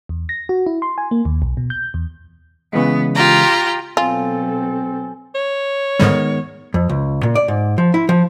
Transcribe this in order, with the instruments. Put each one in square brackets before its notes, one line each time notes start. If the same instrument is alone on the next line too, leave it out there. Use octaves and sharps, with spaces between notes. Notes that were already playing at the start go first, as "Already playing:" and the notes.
[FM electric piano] E2
A#6
F#4
E4
C6
G#5
A#3
D#2
B1
B2
G6
E2
[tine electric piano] C#3 E3 G#3 [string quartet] B3
[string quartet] F4 G4 A#5
[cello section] B2 F#3 A4 [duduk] C4 [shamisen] F4 [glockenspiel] G#5
[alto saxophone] C#5
[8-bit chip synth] G#2 D3 G3 [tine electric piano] D#3 G#3 B3
[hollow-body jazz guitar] F2
C#2
A#2
D5
G#2
F3
E4
F3